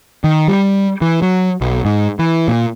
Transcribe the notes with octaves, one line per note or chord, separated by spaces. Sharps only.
D#3
G3
E3
F#3
B1
G#2
E3
A#2